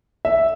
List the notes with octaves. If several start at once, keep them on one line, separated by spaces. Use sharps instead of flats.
E5